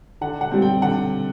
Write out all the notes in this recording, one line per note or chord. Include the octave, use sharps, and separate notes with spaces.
D3 F#5
F#5
G3 C4
G5
D3 F#5